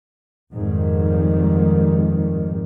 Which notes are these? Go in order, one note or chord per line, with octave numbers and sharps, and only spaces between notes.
F2 G#2 D#3 G3